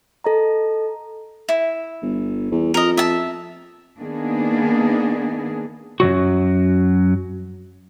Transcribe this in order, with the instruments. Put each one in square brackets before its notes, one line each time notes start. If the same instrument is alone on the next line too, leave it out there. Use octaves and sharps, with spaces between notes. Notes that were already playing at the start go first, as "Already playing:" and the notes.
[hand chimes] A4 D#5 A#5
[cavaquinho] E4
[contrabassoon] G1
E2
[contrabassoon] F2 [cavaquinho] A#4 D#5
[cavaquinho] E5 A5
[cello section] D#3 A#3 B3 D4 G#4
[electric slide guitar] F#2 D#3 F#3 F#4